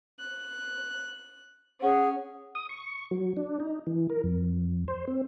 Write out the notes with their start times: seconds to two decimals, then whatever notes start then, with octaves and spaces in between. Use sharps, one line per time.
0.20 F#6
1.82 C#4 G#4 F#5
2.55 D#6
2.69 C#6
3.11 F#3
3.37 D4
3.60 D#4
3.87 E3
4.09 A#4
4.24 F2
4.88 C5
5.07 C4